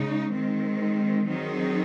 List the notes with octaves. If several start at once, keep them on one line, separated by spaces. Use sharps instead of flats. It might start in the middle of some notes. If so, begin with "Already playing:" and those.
Already playing: C#3 G#3 D#4
D#3 G#3 C4
D#3 F#3 C4 D#4 G#4